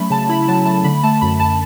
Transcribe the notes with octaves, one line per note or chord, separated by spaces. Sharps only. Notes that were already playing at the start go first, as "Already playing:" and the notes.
Already playing: F#3 A3 C#4 B5
C#3 A5
E4 B5
F#3 A5
A3 A5
D3 B5
A3 A5
F#2 B5
F#2 A5